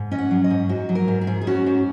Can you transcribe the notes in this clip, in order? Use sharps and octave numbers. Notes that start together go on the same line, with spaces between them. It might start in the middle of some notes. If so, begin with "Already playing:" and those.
Already playing: G#2
C#4 D#5
F#5
F#3
D#5
G#2
G#2 F#4
F#3
A#4
G#2
G#4
G#2
G#4
C#4 F#4
G#2